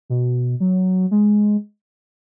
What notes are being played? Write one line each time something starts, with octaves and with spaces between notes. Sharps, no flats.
B2
F#3
G#3